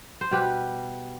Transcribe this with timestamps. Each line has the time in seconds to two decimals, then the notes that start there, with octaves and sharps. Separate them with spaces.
0.21 C5
0.31 B2 G3 G4 B4